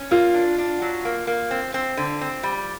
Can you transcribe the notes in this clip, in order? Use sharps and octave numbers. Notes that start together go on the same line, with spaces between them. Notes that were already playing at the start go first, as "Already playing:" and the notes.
Already playing: C#4
A#3 F4
D4
D4
F#3
A#3
A#3
C4
C4
D3
C4
G3